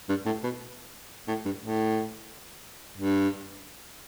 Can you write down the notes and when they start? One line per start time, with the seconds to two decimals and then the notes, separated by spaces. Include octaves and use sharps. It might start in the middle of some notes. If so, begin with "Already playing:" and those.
0.09 G2
0.26 A2
0.43 B2
1.28 A2
1.45 G2
1.62 A2
2.98 G2